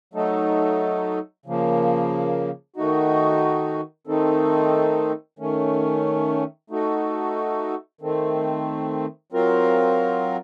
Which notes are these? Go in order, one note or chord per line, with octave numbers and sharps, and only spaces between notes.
F#3 A3 D#4 A4
C#3 F3 A#3
D#3 A3 D#4 F#4
D#3 A3 C4 D#4 A4
D#3 A3 C#4
A3 D#4 F#4 A4
D#3 A3 C4
F#3 C4 F4 A#4